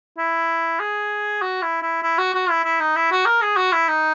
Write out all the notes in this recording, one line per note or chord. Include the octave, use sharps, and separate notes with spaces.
E4
G#4
F#4
E4
E4
E4
F#4
F#4
E4
E4
D#4
E4
F#4
A#4
G#4
F#4
E4
D#4